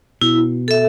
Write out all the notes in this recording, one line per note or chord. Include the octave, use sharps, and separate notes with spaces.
B2 E4
A4 E5